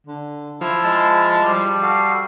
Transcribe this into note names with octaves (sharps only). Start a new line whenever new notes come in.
D3
F3 E4
G#3 A5
G3
F#4 A4 F5